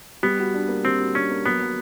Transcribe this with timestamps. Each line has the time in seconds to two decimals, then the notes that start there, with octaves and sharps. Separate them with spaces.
0.23 G3 B3
0.39 F#4
0.54 D4
0.69 A#3
0.85 G3 C4
1.00 F#4
1.14 C#4 D4
1.31 A#3
1.45 F#3 B3
1.60 F#3